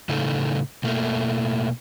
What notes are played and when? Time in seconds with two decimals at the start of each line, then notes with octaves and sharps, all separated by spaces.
0.09 A2 C#3 D#4 A4
0.84 B2 A3 A#3